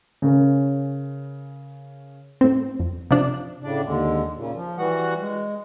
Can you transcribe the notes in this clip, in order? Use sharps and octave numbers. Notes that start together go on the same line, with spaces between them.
C#3 C#4 A#4
A2 C4
F2
C3 F3 D4
A2 C#3 D4 D5
D#2 D3 G#3
A#2 C#3
F3
E3 G3 F#4 F#5
G#3